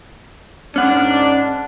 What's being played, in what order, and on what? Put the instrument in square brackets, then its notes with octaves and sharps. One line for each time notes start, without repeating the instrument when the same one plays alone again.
[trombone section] G#2 D4 [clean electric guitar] C#4 F#5